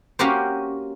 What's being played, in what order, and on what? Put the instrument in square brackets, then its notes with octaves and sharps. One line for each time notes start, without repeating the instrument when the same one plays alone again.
[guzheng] A#3 C#4 F#4 G4 A#4 C5